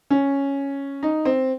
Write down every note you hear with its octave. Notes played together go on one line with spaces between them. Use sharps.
C#4
D#4
C4